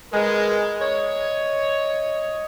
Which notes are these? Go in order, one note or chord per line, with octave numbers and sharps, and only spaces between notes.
G#3 A#4 B4
C#5 D#5